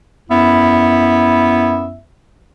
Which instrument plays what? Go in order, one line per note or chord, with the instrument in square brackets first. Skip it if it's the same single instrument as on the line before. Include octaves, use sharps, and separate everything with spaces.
[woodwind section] F#2 B3 E4 E5